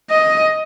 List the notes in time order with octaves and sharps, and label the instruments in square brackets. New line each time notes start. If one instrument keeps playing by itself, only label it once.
[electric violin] D#5